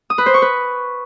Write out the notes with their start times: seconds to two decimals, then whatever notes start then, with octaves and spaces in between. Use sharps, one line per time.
0.10 D#6
0.18 B4
0.26 C5
0.34 C#6
0.42 B4